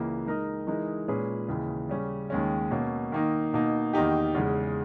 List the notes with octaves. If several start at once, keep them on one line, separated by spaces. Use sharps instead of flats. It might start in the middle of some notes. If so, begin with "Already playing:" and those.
Already playing: C#2 C#3 E3 A#3
G#3 D#4 A#4 D#5
E3 G#3 D#4 A#4
A#2 G#3 C#4 G#4 B4
D#2 C#3 E3
C#3 G3 C#4
D#2 D#3 G#3 C#4
B2 A#3 C#4
D#3 A#3 D#4
B2 A#3 D#4
E2 D#3 A#3 D#4 G4
E2 C#3 G#3